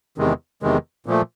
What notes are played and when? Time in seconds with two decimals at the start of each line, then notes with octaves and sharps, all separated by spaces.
0.18 E2 C3 D#3 G#3
0.62 E2 C3 D#3 G#3
1.06 A#2 F3 A3